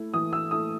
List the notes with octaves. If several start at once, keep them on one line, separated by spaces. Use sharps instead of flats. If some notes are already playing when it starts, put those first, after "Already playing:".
Already playing: A3 E4
E3 D#6
E6
A3 E4 D#6